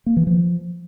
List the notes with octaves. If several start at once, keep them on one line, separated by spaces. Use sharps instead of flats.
A#3
E3
F3